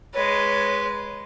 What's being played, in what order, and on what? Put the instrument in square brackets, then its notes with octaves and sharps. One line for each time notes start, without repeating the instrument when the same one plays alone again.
[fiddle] G#3 B4 [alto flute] C#5